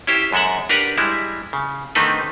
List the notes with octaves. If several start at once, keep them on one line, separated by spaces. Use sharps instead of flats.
C#4 E4 G4 C5
F#2 G#3 A4 E5 F#5
D4 G4 A#4 B4 F#5
G3 G#3 E4
C#3
D3 D#3 A3 C4 D#4 B4